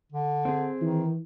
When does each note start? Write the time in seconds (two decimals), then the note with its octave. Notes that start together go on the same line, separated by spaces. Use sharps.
0.12 D3
0.45 C4 G#4
0.82 D#3 E3